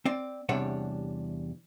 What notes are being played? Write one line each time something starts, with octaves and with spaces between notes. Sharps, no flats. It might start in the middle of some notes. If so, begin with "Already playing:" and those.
C4 D5
E2 C3 G3 D4 C#5 F#5